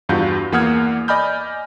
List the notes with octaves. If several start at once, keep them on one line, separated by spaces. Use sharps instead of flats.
E2 G2 F4 F#4 G6
E2 A#3 F#5 D#6 F6 G#6
D5 D#5 G#5 B5 F6 G6